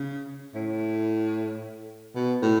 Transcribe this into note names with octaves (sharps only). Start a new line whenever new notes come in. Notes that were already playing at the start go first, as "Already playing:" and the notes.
Already playing: C#3
A2
B2
A2